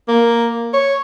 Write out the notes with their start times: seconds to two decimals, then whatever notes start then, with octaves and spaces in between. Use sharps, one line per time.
0.08 A#3
0.74 C#5